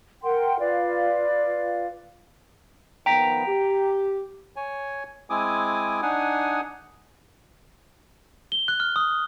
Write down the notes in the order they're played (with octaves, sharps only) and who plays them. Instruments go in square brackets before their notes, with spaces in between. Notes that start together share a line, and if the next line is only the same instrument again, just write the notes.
[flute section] A#4 F#5 G5 C6
F4 B4 D5 F5
[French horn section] D#3 F3 B3 [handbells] G5 A#5 B6
[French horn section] G4
[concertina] C#5 G#5
G#3 C4 E4 G#5 D6 D#6
D4 D#4 F#5 G#5 D#6
[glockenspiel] G7
F#6
F6
D#6